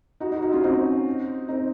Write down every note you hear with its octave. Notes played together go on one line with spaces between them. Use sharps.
D#4 F#4
D#4 F#4
D#4 F#4
C#4 F4
C4 D#4
C4 D#4